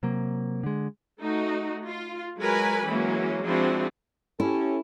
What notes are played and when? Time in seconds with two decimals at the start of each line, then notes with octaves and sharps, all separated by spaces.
0.03 C3 F#3 A#3
0.63 D3 G#3
1.19 A3 D#4 F#4
1.86 F4
2.39 F#3 G#3 A#4 B4 G#5 B5
2.86 E3 F#3 G#3 A#3 C#4
3.44 F3 G#3 C4 D4 E4 F#4
4.40 C#4 E4 G4 A4